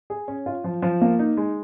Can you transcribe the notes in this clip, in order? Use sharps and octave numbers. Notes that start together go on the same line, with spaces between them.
G#4
C#4
F4
F3
F3
A#3
D#4
G#3